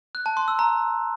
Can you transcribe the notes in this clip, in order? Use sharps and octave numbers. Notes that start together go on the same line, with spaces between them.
F#6
A5
C6
E6
A#5